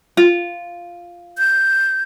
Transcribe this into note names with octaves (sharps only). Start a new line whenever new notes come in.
F4
G6